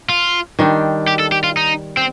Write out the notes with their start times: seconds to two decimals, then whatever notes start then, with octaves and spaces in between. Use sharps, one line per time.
0.09 F4
0.59 D#3 G3 D4
1.08 G4
1.19 A4
1.32 G4
1.44 F4
1.57 D#4
1.97 C4